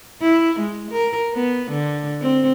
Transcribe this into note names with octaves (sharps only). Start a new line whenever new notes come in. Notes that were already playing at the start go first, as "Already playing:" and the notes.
E4
G#3
A#4
B3
D3
C4